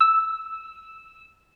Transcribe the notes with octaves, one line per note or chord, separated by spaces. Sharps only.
E6